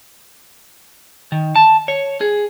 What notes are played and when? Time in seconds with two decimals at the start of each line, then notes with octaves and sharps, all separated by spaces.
1.32 D#3
1.56 A5
1.88 C#5
2.21 G#4